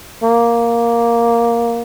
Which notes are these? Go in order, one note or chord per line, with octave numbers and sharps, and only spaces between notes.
A#3